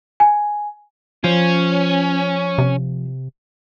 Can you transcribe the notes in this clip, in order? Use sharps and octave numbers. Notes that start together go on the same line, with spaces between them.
G#5
F3 C#4
C3